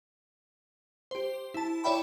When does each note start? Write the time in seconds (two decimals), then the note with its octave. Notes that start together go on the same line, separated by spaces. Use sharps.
1.11 G4 C5
1.54 E4 A5
1.84 E4 C#5 D5 E5 G5 B5